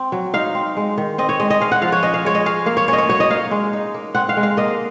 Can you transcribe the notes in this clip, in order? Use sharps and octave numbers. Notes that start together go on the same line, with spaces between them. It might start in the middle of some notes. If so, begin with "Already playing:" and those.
Already playing: C4
F#3
D#4 F5
C4
G#3
D#3
C4 D#5
C#5
G#3 D#5
D#5
G#3 F5
F#5
F3 F5
C#5
C#4 D#5
F5
G#3 C#5
D#5
C#4 F5
A#3 F5
C#5
C#4 C#5 D#5
C#5
F#3 C#5
D#5
D#4 F5
G#3
D#4
A#3
C4 F#5
F5
G#3
F5
A#3 D#5